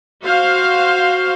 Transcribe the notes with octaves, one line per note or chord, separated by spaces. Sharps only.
F#4 C5 F5